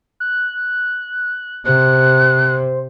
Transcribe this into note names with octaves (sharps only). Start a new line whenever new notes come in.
F#6
C3 C5 F#6